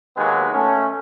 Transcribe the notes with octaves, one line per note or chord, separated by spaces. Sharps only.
D#2 D#3 F#3 G#3 B3
A3 C#4